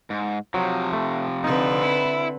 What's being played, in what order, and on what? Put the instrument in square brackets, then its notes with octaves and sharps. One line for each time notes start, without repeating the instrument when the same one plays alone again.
[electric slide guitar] G#2
[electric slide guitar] C3 F3 [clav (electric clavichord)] F#3
[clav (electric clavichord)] A3
[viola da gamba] D3 C4 B4 [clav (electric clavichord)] D#4
[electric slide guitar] E4